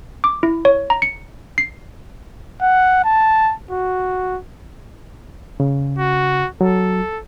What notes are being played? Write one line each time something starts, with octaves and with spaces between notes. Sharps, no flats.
D6
E4
C#5
A#5
C#7
C7
F#5
A5
F#4
C#3
F#4
F#3 A4